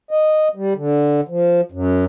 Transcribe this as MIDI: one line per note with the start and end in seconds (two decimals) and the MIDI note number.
0.11 0.48 75
0.56 0.73 55
0.76 1.21 50
1.28 1.61 53
1.72 2.05 42